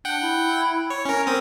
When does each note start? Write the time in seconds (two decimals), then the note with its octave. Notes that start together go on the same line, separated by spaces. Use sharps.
0.05 D4 F#5 G5
0.21 E4
0.90 C#5
1.05 C#4 A#4 G#5
1.27 C4 A#4 D#6